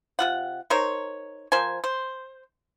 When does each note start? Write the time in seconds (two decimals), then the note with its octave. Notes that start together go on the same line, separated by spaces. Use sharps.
0.19 C3 F4 F#5
0.70 D#4 A#4 C5 C#5
1.52 F3 A#4 C5 G#5
1.84 C5